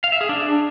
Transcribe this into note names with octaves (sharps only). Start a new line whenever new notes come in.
F5
E5
G#4
D4